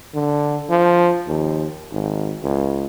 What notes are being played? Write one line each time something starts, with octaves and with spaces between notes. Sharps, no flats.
D3
F3
D#2
G#1
C#2